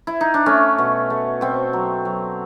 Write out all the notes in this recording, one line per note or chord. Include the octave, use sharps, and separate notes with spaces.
E4
D#4
D4
A3 C#4
B2
A3
B2 C4
F#3
F#3